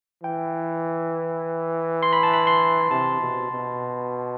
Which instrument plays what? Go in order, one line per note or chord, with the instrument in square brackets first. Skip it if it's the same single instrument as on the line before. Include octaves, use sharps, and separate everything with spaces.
[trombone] E3 [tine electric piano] G5
[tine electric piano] C6
B5
A5
B5
C6
[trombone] C3 [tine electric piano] A5
[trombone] B2
B2